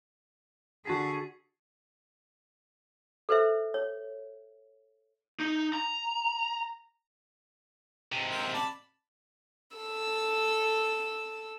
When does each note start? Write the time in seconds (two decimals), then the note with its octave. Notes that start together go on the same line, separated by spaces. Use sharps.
0.85 D3 F#4 G#4 A5 B6
3.29 A4 B4 C5 E5
3.74 C#5
5.40 D#4
5.74 A#5
8.12 G#2 C3
8.30 C4 A#4
8.54 D5 A5 B5
9.77 A4 E6